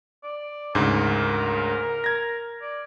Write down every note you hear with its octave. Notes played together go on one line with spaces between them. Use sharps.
D5
D2 G#2 C#3 A#4
G#6 A#6
D5